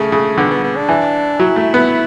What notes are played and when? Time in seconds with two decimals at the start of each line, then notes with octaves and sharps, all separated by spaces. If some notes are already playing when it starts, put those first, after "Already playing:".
Already playing: C#3 A3
0.12 C#3
0.38 D3 B3
0.51 B3
0.64 B3
0.76 D4
0.89 E3
1.40 F#3 E4
1.56 A3
1.74 B3